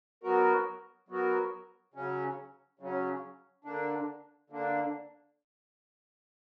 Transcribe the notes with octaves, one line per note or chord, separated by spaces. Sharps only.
F#3 B3 F#4 A#4
F#3 B3 F#4 A#4
C#3 F#3 C#4
C#3 F#3 C#4
D3 A#3 D4
D3 A#3 D4